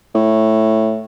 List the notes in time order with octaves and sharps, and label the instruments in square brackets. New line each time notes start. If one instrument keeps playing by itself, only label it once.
[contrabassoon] A2